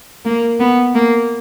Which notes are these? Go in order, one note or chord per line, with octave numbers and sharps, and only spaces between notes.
A#3
B3
A#3